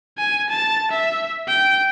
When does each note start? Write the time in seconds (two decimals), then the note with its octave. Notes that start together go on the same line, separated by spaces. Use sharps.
0.18 G#5
0.50 A5
0.91 E5
1.48 G5